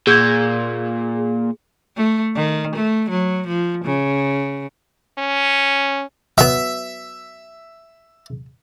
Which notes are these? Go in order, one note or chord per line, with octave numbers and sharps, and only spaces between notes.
A#2 G#4 E6 G6 G#6
A3
D#3
A3
F#3
F3
C#3
C#4
F#3 B3 E5